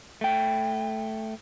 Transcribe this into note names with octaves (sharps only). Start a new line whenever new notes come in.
A3 G5